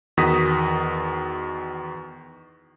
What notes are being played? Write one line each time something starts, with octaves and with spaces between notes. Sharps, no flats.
E2 D#3 F#4 D#6 A#6 B6